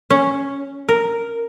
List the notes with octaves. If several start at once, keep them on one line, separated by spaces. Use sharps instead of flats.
C#4
A#4